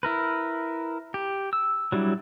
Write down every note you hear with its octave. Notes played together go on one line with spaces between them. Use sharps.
E4 A#4 B4
G4
E6
F#3 G3 D4 E4